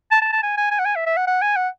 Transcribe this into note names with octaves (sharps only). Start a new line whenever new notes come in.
A5
A5
A5
G#5
G#5
G#5
F#5
G#5
E5
E5
F#5
F#5
G#5
F#5